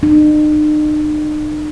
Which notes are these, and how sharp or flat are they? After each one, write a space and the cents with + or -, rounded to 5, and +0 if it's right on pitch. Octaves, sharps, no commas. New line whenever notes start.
D#4 -45